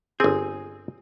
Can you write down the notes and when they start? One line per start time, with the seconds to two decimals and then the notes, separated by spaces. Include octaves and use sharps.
0.20 G1 C4 G#4